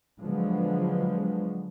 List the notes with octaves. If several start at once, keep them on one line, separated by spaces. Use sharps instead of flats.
D3 F3 F#3 G#3 B3